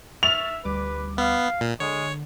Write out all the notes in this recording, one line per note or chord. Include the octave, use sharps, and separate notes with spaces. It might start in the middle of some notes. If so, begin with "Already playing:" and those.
E5 C#6 F6 A6 F7
D2 G3 B4 D6
B3 F5
A#2
D3 G#3 C#5